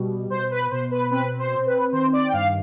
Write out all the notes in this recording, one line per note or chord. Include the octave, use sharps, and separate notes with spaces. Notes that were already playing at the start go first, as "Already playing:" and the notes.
Already playing: B2 G3
B2 C5
B4
B2 C5
B4
C4 B4
C5
C4
B4
D#3 C5
D5
G5
G2 F5